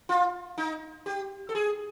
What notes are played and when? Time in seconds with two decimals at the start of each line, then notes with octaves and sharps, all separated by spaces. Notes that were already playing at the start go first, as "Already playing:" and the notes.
0.09 F4
0.58 D#4
1.06 G4
1.49 A4
1.55 G#4